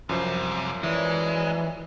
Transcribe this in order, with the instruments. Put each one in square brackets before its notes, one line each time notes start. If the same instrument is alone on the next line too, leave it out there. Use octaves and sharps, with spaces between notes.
[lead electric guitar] C2 C3 [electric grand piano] F#2 F3 C5
[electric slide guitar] E3 [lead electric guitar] G#3 [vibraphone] C#5 D5